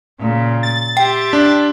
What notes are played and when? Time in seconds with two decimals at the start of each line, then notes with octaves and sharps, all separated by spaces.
0.19 A#2 C#3
0.63 A6
0.97 G4 E5 G5 C6
1.33 D4